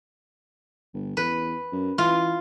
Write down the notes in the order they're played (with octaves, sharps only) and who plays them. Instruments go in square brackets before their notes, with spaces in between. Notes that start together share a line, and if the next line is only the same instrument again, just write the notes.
[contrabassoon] G1
[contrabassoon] E2 [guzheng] B4
[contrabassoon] F#2
[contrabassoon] E3 [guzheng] F4